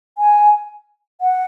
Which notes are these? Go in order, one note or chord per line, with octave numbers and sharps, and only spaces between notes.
G#5
F#5